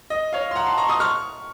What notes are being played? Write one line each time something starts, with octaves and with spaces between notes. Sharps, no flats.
D#5
C#5 F5
C6
F#5 A#5
A5 C6
A#5 C#6
C6 D#6
C#6 F6